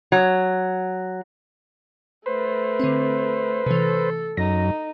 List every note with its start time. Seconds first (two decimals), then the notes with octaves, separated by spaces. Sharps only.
0.12 F#3
2.26 A3 B4 C5
2.80 D3 C4
3.66 C3 E3 A4
4.37 F#2 D#4 A#6